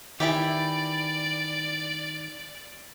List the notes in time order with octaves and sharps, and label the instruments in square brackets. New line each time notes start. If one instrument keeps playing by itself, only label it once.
[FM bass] D#3 [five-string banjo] E3 E4 G4 [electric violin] D5